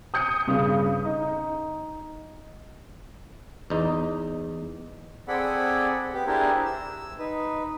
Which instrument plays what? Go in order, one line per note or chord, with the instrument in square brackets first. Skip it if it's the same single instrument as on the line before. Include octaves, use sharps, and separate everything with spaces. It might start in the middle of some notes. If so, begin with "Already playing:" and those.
[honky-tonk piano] D#6 G6 C#7
[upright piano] G2 C#3
D#4
[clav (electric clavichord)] E2 D#4
[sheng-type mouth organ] C4 G#4 A4 D5 F#5 B5
B3 G4
D4 E4 G4 G#4 A#4 C5
E6
D#4 B4